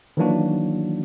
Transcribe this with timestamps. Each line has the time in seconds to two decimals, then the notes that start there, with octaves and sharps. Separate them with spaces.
0.17 D#3 E3 F#3 A#3 D4 F#4